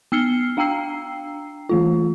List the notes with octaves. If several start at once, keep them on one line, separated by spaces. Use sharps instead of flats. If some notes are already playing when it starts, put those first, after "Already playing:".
B3 E6 F6 C7 C#7 G7
D4 F5 G5 A#5 E6 C7
E3 A3 F4